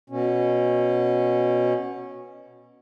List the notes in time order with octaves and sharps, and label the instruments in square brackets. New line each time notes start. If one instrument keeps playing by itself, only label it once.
[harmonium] B2 C#4